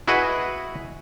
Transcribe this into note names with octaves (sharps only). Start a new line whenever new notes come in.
E4 F#4 G#4 B4 D#5 F#5